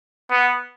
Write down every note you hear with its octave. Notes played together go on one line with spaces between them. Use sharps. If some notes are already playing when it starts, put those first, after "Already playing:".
B3